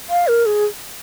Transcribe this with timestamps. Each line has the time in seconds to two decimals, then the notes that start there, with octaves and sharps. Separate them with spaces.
0.10 F5
0.28 A#4
0.46 G#4